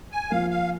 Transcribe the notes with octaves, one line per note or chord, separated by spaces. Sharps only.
G#5
F3 A#3 F4 A#4 F5
F5